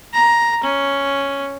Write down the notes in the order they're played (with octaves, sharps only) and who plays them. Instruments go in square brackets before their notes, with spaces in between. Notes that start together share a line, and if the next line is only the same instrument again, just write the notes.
[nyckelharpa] A#5
C#4